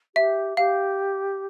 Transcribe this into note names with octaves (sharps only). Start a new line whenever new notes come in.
G4 E5
G4 F5